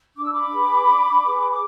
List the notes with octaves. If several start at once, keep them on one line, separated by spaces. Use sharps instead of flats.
D4 D6
E6
B5 D6
G#4 B4
D4
G#4 B4
D6